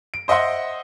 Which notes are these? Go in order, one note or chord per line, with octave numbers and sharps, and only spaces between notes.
D7
C5 D#5 E5 F#5 C6